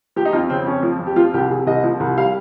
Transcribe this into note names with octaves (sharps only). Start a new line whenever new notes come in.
F3 G4
D#4
F2 F4
C#3 C4
F2 C#4
F3
F2
G4
F3 F4
C2 G4
C3 G#4
C2 D#5
F3
C2
G3 F5